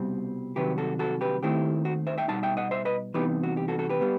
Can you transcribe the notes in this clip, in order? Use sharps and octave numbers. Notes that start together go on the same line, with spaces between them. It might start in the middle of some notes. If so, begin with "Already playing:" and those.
Already playing: C2 B2 G3 C4
C2 C3 D#3 F#3 G4 B4
F#4 A4
F#4 A4
G4 B4
D#2 D#3 A3 C4 E4 G4
F#4
C5 E5
E5 G5
B2 G3 D#4 F#5 A5
E5 G5
D#5 F#5
C5 E5
B4 D#5
C2 C3 E3 B3 D#4 G4 B4
F#4
G4
F#4 A4
F#4 A4
G4 B4
G3 B3